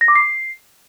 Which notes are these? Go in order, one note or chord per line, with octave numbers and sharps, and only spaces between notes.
A#6
D6
C7